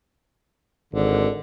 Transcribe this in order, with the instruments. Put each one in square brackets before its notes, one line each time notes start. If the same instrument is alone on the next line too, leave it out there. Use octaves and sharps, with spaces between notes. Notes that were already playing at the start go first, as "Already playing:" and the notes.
[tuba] G#1 [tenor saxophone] D3